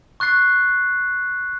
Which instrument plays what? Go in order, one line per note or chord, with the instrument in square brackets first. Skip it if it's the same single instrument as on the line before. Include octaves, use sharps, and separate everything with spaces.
[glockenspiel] C#6 F#6 A6 C7